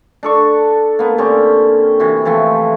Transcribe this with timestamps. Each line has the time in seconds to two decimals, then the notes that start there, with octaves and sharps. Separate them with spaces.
0.23 D4 A4 C#6
0.99 A#3 B3
1.18 D3 C4 C#4 G4
2.00 C3 E3 F#4
2.25 E3 F3 A3 C4